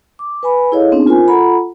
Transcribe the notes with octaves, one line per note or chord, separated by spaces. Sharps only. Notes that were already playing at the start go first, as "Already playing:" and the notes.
D6
B4 G#5 B5
E4 G#4 A4 C#5 D#5 F5
B3 C4 D4 D#4 G#4
F4 A#4 C5 G#5
F4 A4 F#5 A#5 B5